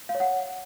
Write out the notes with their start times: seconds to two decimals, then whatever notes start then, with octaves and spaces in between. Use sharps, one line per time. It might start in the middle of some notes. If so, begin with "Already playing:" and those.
0.09 F5
0.15 C#5
0.20 F#5